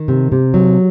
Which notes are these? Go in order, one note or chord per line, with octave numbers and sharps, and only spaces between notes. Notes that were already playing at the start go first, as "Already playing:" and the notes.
Already playing: D#3
C3
C3
F#3